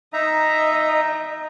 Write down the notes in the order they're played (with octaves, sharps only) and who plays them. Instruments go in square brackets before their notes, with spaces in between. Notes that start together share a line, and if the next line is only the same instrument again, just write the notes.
[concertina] D#4 E5 A#5 [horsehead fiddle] D#5